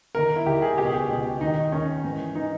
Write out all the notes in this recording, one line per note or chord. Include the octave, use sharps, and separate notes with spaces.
D#2 D#3 A#4
E4
D#2 D#3 G4
G#4
C#2 B2 G4
G#4
G4
C#2 B2
D#2 D#3 D#4
D#2 D#3 C#4
G#2 E3
E3 D#4